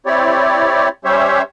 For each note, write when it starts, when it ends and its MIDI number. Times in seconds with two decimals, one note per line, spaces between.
0.06 0.89 60
0.06 0.89 64
0.06 0.89 67
0.06 0.89 73
0.06 0.89 74
1.05 1.42 55
1.05 1.42 61
1.05 1.42 67
1.05 1.42 72
1.05 1.42 73
1.05 1.42 76